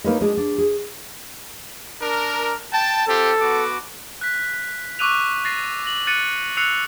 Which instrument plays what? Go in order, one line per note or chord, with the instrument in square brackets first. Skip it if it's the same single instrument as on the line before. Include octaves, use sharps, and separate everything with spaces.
[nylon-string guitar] A#3 D#4 A#4 B4 C#5 D#5
G#3 D4 G#4 D#5
D4
G#4
[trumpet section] D4 A#4
G5 A5
[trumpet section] C4 F4 G4 [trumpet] A4
[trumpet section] B3 F#4 D6
[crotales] F#6 B6
C#6 D6 E6 F#6 D#7 F7
A6 A#6 C7
A#6 F#7
F#6 A6 C#7 D#7
E6 F#6 C7 C#7 F7